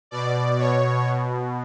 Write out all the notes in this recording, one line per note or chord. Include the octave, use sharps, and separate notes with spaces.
B2 D5
B2 C#5
B2